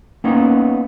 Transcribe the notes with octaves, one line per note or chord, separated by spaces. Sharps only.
A#3 B3 C#4 D#4